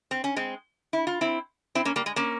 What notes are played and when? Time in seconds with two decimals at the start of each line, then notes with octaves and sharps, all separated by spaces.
0.11 C4
0.24 C#4
0.36 G#3 C4
0.93 E4
1.07 F4
1.21 C4 E4
1.75 C4 E4
1.85 A#3 C#4
1.96 G3 A#3
2.06 G#3
2.16 A#3 C#4